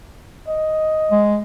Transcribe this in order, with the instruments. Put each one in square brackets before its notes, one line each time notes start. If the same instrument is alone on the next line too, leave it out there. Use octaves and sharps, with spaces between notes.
[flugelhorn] D#5
[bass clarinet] G#3